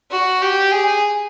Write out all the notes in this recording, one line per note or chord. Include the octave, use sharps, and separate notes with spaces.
F#4
G4
G#4